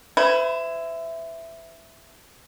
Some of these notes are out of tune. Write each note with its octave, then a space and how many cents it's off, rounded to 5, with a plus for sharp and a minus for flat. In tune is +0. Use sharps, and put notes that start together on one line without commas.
E4 +5 C5 -45